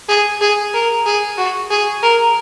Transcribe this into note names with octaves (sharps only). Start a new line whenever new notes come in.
G#4
G#4
A#4
G#4
F#4
G#4
A#4